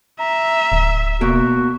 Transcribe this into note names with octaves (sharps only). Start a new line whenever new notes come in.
E5 A#5
D1
B2 A#3 F#4 A#4